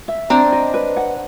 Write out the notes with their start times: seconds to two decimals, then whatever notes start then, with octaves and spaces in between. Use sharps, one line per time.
0.08 E5
0.30 C4 D4 A#5
0.52 D#5
0.74 B4
0.97 F#5